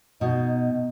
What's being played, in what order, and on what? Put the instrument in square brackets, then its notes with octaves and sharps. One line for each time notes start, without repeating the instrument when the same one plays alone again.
[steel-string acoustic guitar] B2 [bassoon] D#4